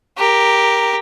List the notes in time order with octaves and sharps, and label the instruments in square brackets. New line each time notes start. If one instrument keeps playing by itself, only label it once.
[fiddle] G4 A#4